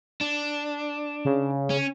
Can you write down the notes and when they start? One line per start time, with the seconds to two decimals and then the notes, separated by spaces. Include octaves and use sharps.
0.21 D4
1.25 C#3
1.70 C#4